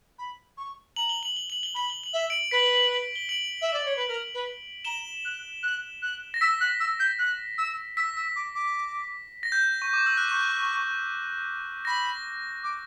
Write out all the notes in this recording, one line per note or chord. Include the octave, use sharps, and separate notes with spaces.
B5
C#6
A#5 F#7
G7
F#7
G7
F#7
G7
B5 F#7
G7
F#7
E5 G7
D7 F#7
B4 B6 D7
G7
D7 F#7
E5
D5
C#5
B4
A#4
B4
A#5 E7 G7
F#6
F#6
F#6
A#6
E6 B6
F#6
E6
G6
F#6
E6
E6 B6
E6
D6
D6
A#6
G6
C#6
D6
E6
F#6
C#6 G6
B5 A#6
D6